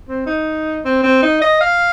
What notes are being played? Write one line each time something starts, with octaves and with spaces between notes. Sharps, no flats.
C4
D#4
C4
C4
D#4
D#5
F5